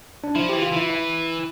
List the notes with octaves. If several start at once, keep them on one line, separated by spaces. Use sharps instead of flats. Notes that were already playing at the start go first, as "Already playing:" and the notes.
D4
F3 E4
E3 G4
F4
E3 E4
E4